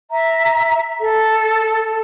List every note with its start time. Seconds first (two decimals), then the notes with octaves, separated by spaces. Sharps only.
0.11 E5 A#5
1.00 A4